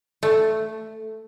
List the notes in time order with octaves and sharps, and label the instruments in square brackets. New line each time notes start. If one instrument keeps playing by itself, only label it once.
[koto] A3